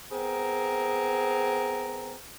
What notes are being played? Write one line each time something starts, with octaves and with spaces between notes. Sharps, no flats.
B3 C4 G#4 A#4